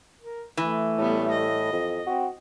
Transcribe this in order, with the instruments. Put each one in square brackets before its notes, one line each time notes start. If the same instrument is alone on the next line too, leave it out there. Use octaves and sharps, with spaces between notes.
[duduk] A#4
[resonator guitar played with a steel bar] E3 [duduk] A3
[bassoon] A2 [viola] G3 B3
[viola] D#5
[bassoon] F2
[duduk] C4 [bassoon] F#4